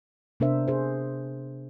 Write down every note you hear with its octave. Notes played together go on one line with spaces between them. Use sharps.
C3 B3 D4 A#4 C5 E5
G#4 C5